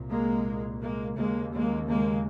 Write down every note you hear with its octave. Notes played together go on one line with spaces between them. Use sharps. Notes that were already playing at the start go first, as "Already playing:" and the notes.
Already playing: C2 A#2
G#3 A#3
G#3 A#3
D#2 C#3 G#3 A#3
G#3 A#3
G#3 A#3